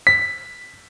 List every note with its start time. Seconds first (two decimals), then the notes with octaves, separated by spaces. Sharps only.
0.07 B6